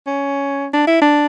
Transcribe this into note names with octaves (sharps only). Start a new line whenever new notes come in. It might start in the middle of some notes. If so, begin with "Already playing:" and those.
C#4
D4
E4
D4